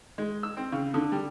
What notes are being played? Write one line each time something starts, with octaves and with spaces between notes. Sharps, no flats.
G#3
E6
C4
C#3
D3
G3